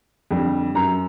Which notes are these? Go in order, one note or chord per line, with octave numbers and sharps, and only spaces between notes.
F2 D3 G3
F#2 A#5